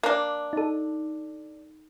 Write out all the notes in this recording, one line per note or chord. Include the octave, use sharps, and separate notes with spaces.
A#3 D4
D#4 A4